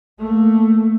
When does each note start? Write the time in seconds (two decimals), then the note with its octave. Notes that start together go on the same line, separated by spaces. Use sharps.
0.19 A3 A#3